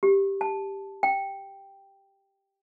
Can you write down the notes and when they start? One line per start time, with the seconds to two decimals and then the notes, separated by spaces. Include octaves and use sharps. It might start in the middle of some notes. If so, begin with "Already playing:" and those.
0.03 G4
0.41 A5
1.03 G5